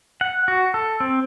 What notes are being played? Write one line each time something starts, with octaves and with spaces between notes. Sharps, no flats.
F#5
F#4
A4
C4